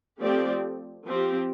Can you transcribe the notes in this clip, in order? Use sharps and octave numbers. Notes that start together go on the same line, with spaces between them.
F3 A3 C4 G4 D5
F3 C4 G4